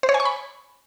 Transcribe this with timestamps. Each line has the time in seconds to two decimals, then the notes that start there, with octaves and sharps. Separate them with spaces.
0.03 C5
0.09 C#5
0.14 G#5
0.20 C#6
0.25 B5